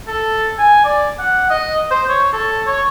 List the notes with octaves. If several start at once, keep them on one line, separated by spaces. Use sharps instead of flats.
A4
G#5
D5
F#5
D#5
C5
C#5
A4
C#5